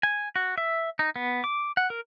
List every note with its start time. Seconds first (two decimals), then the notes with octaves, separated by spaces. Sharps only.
0.03 G#5
0.36 F#4
0.58 E5
0.99 D#4
1.16 B3
1.44 D6
1.77 F#5
1.90 A#4